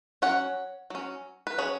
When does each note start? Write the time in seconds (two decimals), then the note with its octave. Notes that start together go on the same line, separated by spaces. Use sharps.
0.22 F#3 C#4 C#5 F#5
0.90 F#3 C#4
1.47 B4
1.58 F#3 C#4 G#4 C#5